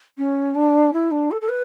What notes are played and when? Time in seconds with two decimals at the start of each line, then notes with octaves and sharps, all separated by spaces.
0.18 C#4
0.54 D4
0.93 E4
1.11 D4
1.31 A4
1.41 A4
1.48 B4